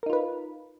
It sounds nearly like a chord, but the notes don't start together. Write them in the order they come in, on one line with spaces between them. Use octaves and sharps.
A#4 D#4 F4 B4